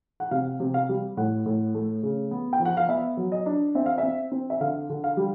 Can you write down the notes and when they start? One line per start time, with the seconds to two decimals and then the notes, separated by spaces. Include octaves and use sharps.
0.20 F#5
0.31 C3 F5
0.60 C3
0.74 F5
0.89 G3
1.17 A2 F#5
1.46 A2
1.75 A3
2.03 C#3
2.31 B3
2.53 G5
2.60 F3
2.65 F#5
2.77 F5
2.88 B3 E5
3.17 F#3
3.32 D#5
3.46 D4
3.75 C4 E5
3.86 F5
3.98 E5
4.03 C4
4.31 C4
4.50 E5
4.61 D3 F5
4.90 D3
5.04 F5
5.17 G3